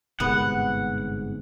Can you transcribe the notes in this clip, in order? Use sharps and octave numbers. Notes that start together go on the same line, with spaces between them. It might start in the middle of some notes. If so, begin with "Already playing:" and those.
G1 G#2 C3 B3 F#5